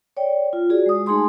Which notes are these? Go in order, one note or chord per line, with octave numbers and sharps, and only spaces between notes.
C#5 D5 G5
F4
F#4 G#4 D5
G#3 D#6
A3 D#4 G#4 G#5 C6 D#6